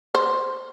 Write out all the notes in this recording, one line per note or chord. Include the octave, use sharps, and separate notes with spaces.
C5